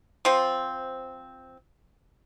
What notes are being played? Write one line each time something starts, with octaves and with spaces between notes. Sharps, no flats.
F3 C4